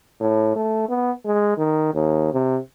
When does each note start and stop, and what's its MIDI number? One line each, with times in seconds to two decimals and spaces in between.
0.20 0.53 45
0.56 0.86 57
0.89 1.11 59
1.25 1.57 56
1.57 1.91 51
1.94 2.32 39
2.33 2.58 48